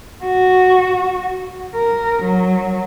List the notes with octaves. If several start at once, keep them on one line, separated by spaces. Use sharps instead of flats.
F#4
A#4
F#3